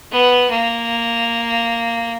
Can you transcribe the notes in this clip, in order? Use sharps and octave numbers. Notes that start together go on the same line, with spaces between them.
B3
A#3